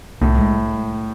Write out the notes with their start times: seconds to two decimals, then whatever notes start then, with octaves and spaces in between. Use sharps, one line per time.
0.21 C2 A2
0.39 G#3